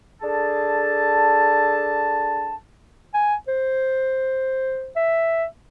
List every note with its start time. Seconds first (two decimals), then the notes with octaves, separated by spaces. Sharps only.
0.22 D4 G#4 A4 A5
3.14 G#5
3.48 C5
4.96 E5